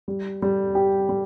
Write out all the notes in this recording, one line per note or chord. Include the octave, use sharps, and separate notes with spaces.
G3
G3
G4
G3